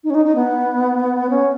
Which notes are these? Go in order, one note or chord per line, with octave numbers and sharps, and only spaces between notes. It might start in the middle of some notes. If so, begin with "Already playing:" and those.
D#4
C#4
D#4
D#4
B3
C#4